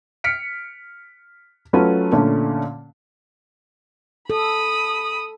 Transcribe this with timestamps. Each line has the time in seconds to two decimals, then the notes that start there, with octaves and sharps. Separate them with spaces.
0.24 F6 B6 C#7 D7
1.73 F#3 A3 C#4 F4 B4
2.12 A#2 D3 A3 C#4
4.30 A4 B5 D#6